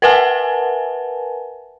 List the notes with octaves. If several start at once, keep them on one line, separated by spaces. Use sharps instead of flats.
A#4 B4 E5 F#5 G#5 A5